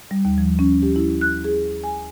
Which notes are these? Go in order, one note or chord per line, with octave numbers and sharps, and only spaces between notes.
G3
D#2
F3
C#4
G4
E4
F#6
G#4
G#5